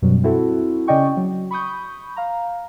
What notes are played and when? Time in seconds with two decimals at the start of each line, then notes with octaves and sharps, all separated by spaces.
0.02 F#2 B2 F#3 G3
0.24 C4 E4 F#4 A4
0.88 C#3 C#4 D5 D#5 G5 C#6
1.17 F#3
1.51 B5 C#6 D#6 G6
2.16 F5 A#5